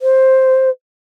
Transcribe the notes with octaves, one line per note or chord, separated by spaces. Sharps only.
C5